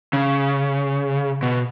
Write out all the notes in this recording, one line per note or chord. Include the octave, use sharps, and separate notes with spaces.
C#3
B2